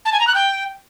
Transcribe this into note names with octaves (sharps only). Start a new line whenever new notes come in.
A5
G#5
A#5
F#6
G5